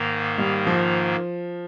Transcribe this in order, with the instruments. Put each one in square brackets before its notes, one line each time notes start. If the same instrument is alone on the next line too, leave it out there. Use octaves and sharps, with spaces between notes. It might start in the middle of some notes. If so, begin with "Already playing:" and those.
Already playing: [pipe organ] G#2 D#3 A#3
[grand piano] G3
F3